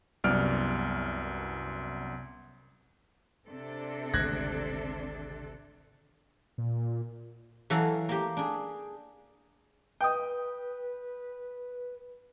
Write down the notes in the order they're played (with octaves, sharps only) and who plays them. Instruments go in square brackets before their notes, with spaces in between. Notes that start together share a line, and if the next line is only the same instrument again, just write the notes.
[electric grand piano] C2 F#2 B3 D5 F6 D7
[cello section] C3 D4 A4
[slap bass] G#1 D2 C#3 [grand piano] F#6 G#6 A#6
[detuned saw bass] A#2
[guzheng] E3 F#3 A4 F5 F#5
A#3 G4
D4 G#4
[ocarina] B4 [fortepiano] G5 D#6